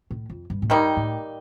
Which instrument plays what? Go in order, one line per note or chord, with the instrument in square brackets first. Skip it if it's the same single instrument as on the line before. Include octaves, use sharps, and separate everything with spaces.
[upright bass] A2
F2
G2
A2
[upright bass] G2 [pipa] D#3 G3 A#3 D#4
[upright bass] A2